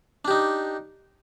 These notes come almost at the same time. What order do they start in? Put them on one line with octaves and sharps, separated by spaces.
D4 G4 D#4